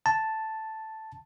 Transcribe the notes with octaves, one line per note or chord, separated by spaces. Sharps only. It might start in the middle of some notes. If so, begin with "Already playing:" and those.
A5